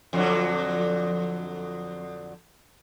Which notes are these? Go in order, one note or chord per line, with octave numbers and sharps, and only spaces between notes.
F2 D3 F#3